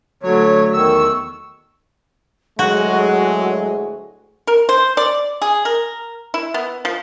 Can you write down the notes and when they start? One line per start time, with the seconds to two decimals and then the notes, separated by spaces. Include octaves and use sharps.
0.23 D3 F#3 A3 C#5
0.73 E2 D#3 C#6 E6
2.59 D2 A2 F#3 G#3 F#4 G#4
4.47 A#4
4.69 C5
4.97 D5
5.42 G#4
5.65 A#4
6.34 E4
6.54 B3
6.85 F3